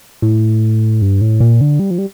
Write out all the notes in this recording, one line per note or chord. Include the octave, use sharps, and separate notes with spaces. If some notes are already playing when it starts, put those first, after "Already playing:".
A2
G2
A2
A#2
D3
G3
F3
G3